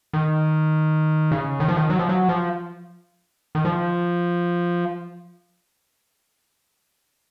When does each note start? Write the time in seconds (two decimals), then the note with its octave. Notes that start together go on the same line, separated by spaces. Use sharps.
0.13 D#3
1.31 C#3
1.60 D#3
1.68 F3
1.76 D#3
1.90 F#3
1.99 F3
2.09 F#3
2.29 F3
3.55 D#3
3.65 F3